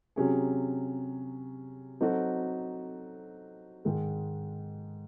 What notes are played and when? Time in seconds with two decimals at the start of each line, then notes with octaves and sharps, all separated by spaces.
0.16 C3 F#3 C#4 G#4
2.00 F#3 C4 D#4 F#4 A4
3.85 G#2 D#3 G#3